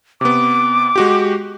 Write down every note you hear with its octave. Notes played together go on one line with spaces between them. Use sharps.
C3 B3 D6
G#3 F#4 G4